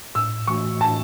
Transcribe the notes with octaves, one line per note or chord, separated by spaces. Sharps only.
A2 E6
E3 A3 F#4 C#6
A2 A5